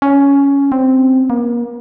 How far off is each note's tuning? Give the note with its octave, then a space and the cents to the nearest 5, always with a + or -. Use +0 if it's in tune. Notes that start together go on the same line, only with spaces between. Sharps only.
C#4 +10
C4 -5
A#3 +35